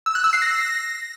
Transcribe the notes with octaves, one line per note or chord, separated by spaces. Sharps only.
E6
F#6
E6
C7
A#6